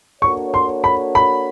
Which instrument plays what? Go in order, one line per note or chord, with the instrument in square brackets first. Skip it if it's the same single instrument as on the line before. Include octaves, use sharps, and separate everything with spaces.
[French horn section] A#3 D4 F#4 A4 C#5 [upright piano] C#6
[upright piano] C6
B5
B5